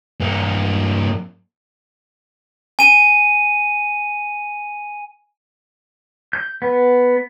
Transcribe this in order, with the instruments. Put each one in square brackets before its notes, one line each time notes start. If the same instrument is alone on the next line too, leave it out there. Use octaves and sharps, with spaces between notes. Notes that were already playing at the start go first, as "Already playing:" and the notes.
[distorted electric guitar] G2 A#3
[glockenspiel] G#5 D#7
[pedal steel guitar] G6
B3